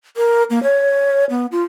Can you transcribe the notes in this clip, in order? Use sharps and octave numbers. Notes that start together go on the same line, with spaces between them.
A#4
A#3
C#5
B3
F4